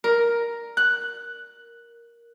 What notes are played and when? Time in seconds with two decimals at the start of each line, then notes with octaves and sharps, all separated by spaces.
0.04 A#4
0.77 F#6